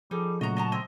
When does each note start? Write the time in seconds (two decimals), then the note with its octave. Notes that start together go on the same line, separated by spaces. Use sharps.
0.11 F3 G3 D#4 G#4 A4
0.41 A#2 C#3 F#3 A3 F#4 D#5 A#5
0.57 D#5 A5 A#5
0.72 C4 D#5